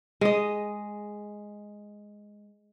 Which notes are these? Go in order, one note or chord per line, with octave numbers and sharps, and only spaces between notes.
G#3 D#5